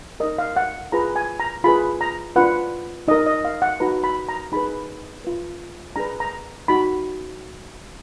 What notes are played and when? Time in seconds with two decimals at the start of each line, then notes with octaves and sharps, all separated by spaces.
0.20 D#4 A#4 D#5
0.38 F5
0.56 F#5
0.92 F4 G#4 B4 A#5
1.16 G#5
1.40 A#5
1.64 F4 G#4 B4 B5
2.01 A#5
2.36 D4 F4 B4 F#5
3.08 D#4 A#4 D#5
3.27 D#5
3.45 F5
3.62 F#5
3.80 D#4 F#4 B4 A#5
4.04 B5
4.29 A#5
4.52 D#4 G#4 B4 B5
5.25 F4 B4
5.96 D4 G#4 B4 A#5
6.20 A#5
6.68 D#4 F#4 B5